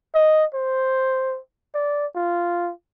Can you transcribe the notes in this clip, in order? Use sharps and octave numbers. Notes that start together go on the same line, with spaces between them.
D#5
C5
D5
F4